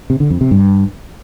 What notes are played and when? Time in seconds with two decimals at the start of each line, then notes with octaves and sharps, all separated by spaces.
0.10 C3
0.20 D3
0.30 F2
0.41 C3
0.51 G2